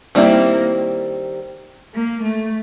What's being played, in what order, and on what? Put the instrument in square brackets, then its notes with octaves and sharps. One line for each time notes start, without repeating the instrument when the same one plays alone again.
[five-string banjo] D#3 G3 C4 E4 [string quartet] A#3
[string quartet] A#3
A3